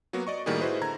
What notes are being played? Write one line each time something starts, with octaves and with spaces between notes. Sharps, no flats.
F#3 A#3 B3 F#4
D5 D#5 C#6
A2 D#3 G3 A#3 F#4 G#4
E4 F#4 G#4 B4 C5 D#5
D3 A#5 G#6